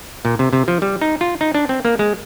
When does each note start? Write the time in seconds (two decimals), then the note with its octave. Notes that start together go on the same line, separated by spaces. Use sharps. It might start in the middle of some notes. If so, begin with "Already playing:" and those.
0.25 A#2
0.39 C3
0.53 C3
0.68 F3
0.82 G3
1.01 D#4
1.21 F4
1.41 D#4
1.55 D4
1.69 C4
1.85 A#3
1.99 G#3